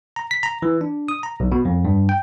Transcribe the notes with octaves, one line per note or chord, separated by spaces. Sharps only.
A#5
B6
A#5
E3
D4
D#6
A#5
B1
B2
F2
G2
G5